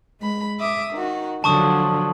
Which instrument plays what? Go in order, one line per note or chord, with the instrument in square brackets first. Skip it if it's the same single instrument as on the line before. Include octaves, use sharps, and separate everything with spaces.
[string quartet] G#3 B5
E5 D6 D#6
D#3 F#4
[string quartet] D3 F3 F#3 [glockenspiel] A5 C#6 D#6